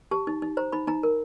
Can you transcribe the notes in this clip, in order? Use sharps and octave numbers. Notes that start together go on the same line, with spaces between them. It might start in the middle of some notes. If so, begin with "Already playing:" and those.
G4 A5
D#4
D#4
C5 A#5
D#4 B5
D#4 A#5
A#4